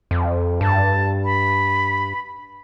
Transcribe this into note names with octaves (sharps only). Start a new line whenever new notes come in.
F2
G2 A5
B5